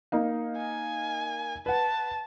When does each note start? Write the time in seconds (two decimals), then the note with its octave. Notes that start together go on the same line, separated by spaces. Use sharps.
0.12 A#3 D#4 F5
0.56 G#5
1.66 B4 F#5 A5